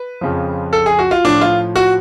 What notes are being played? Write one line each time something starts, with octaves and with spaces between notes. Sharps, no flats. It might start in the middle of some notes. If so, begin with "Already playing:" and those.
Already playing: B4
F2 C#3 F3
A4
G#4
F#4
F4
A2 F3 D4
F4
F#4